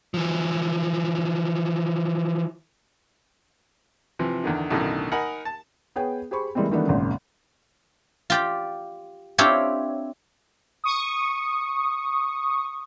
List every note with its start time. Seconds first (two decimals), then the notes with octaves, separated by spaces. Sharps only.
0.14 E3 F3
4.19 C3 E3 F3
4.44 E2 D3 D#3
4.70 B1 F#2 A2 D3 D#3
5.12 D#4 A#4 D#5 F#5 G#5 B5
5.45 A5
5.96 B3 G#4 B4 C#5 G5
6.31 G4 G#4 C5 B5 C#6
6.55 E3 G3 G#3 A#3 C4
6.71 D#3 E3 G3 A3 B3 D4
6.87 G#1 F#2 A#2 C#3
8.30 F4 G4 D5
9.38 C4 D4 E4 F4 G4 C#5
10.84 C#6 D#6